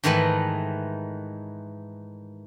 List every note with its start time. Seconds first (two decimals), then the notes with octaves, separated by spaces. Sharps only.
0.04 G#2 D#3 E3 A3 B4